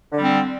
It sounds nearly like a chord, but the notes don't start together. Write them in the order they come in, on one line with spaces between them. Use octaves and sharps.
D3 G3 C4